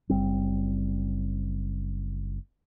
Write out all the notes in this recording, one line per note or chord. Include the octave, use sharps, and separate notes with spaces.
F#1 G3 C4